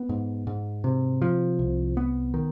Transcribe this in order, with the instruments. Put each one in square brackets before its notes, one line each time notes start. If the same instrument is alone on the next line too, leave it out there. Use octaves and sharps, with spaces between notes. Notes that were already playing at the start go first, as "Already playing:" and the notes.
Already playing: [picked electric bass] B3
G#2
G#2
C3
F3
C2
B3
D#3